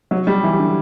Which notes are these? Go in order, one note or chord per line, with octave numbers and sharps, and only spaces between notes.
F#3
G3
E3
D3